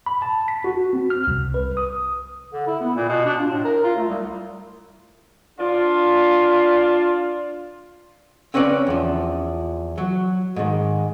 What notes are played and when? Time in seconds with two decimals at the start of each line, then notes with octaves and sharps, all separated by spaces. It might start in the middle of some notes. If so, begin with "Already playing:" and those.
0.06 B5
0.22 A5
0.48 B6
0.64 F#4
0.93 C4
1.10 F6
1.27 C2
1.54 B4
1.77 D#6
2.53 D3
2.67 E4
2.80 B3
2.96 A#2
3.08 B2
3.25 D4
3.38 F4
3.50 A2
3.64 A#4
3.84 F4
3.96 A3
4.08 C2
5.59 D4 F4
8.54 C4 C#4 B4 C#5 D5
8.87 E2 F3
9.98 F#3
10.56 G#2 D#3